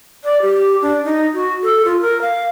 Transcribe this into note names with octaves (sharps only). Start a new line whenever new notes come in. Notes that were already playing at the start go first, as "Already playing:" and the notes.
D5
G4
D4
D#4
F#4
A4
F4
A#4
F5